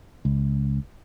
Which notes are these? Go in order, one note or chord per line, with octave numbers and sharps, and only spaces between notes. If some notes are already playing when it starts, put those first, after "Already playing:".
C#2